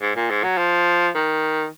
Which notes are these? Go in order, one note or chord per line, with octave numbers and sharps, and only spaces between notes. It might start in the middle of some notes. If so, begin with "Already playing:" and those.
G#2
A#2
G#2
F#3
F3
D#3